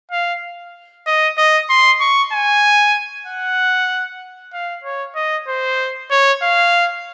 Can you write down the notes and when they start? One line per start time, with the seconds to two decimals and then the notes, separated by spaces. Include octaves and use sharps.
0.11 F5
1.07 D#5
1.38 D#5
1.70 C6
2.01 C#6
2.33 G#5
3.27 F#5
4.53 F5
4.84 C#5
5.15 D#5
5.48 C5
6.11 C#5
6.43 F5